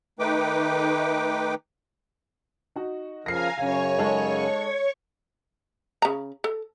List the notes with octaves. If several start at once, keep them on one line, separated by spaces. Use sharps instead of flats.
D#3 A3 D#4 B4 G5 D6
D#4 F#4
C#3 F3 A#4 F5 G#5 A#5 A#6 C7
F#2 C#3 C#4 C#5 F5 G#5 C#6
G#3 D#4 A4
C#3 A#5
A4